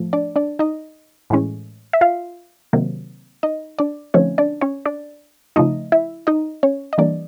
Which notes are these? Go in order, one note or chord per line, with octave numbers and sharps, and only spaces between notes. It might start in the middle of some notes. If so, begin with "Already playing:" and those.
Already playing: A2 F3 A3
D4 D5
D4 D5
D#4 D#5
A2 E3 G#3 C#4
E5
F4 F5
C3 D#3 F#3 A#3
D#4 D#5
D4 D5
D3 F3 A3 C4 C#4 D#4 C#5
D4 D5
C#4 C#5
D4 D5
C#3 F3 A3 D#4 D#5
E4 E5
D#4 D#5
C#4 C#5
D#5
E3 G3 A#3 D4 D5